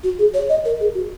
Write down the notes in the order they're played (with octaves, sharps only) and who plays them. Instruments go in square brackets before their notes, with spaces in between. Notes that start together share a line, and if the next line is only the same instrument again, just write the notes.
[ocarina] F#4
G#4
C#5
D#5
A#4
G#4
F#4